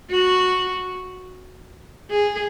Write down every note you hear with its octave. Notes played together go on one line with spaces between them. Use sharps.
F#4
G#4